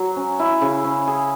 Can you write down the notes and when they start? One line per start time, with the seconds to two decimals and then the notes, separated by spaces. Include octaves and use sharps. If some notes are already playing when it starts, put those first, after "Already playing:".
Already playing: F#3
0.16 C#4
0.39 E4
0.61 C#3
0.84 C#4
1.07 G#4